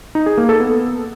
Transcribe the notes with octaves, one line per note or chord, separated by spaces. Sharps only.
D#4
G#4
A#3
A4
B3